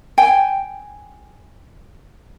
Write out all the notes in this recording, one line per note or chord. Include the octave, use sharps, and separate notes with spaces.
G5 G#5